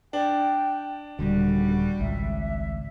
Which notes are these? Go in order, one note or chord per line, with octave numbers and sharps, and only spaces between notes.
D4 G5
D#1 D3 G3 F#4
G#1 C#2 E5